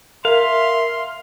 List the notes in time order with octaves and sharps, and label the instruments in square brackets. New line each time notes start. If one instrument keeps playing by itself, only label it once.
[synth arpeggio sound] A#4 [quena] E5 [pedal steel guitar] F5 [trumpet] C6